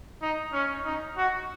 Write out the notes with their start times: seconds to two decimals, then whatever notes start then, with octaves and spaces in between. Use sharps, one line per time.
0.22 D#4
0.53 C#4
0.85 D#4
1.17 F#4